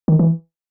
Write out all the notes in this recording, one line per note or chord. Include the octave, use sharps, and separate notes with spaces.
D#3
E3